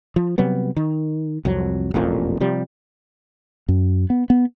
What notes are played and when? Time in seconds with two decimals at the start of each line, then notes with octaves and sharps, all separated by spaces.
0.16 F3
0.38 C3 F#3 G3 B3
0.76 D#3
1.45 C2 F2 F#3
1.94 E1 A1 F2 A#2
2.40 C3 F3 G3
3.68 F#2
4.10 B3
4.30 B3